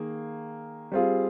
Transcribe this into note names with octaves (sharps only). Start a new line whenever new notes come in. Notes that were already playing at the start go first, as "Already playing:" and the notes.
Already playing: D#3 A#3 G#4
G3 C4 F4 G#4